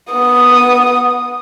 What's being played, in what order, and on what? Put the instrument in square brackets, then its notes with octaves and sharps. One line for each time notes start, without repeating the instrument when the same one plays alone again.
[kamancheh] B3 D#6